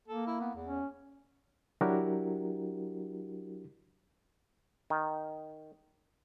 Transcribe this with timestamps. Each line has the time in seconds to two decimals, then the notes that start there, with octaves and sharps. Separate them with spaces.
0.08 A#3 A4
0.27 E4
0.41 B3
0.55 E2
0.67 C#4
1.81 F#3 D4 E4 F#4 G4 A#4
4.90 D#3